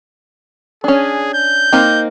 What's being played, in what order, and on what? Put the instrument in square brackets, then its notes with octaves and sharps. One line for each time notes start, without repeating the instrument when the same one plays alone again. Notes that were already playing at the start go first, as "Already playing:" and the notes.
[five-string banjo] C#4 D4 [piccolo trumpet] G#4
[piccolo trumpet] G6
[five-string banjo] A#3 C4 D#4